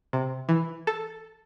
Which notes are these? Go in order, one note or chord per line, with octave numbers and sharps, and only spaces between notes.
C3
E3
A4